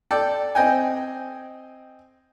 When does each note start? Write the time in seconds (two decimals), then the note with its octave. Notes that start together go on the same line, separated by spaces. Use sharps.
0.11 A4 D5 G5
0.55 C4 D#5 G5 G#5